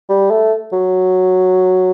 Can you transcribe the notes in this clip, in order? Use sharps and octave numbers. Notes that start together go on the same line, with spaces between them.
G3
A3
F#3